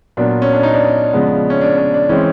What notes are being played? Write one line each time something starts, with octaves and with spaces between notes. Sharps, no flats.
A#2 F#3 B3 D4
C#4
D4
D#4
D4
C#3 F3 G#3 B3
C#4
D4
C#4
D4
E3 G#3 C4 C#4